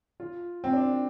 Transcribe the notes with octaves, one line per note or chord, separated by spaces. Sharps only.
F4
C4
D4